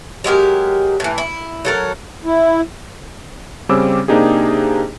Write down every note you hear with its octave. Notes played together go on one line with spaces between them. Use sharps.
F#3 G#3 G4 A#4
A2 E3
E4
F#3 A4 A#4
E4
C#3 G3 C4 C#4 D6 E6
C3 A#3 D4 D#4 G4 G#4